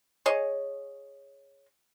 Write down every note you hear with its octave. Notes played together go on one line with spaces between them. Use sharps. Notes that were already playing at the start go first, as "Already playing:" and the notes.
G#4 C#5 D#5